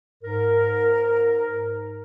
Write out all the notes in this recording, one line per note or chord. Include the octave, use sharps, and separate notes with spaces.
G#2 A#4